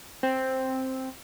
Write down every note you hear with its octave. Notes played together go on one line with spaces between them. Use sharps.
C4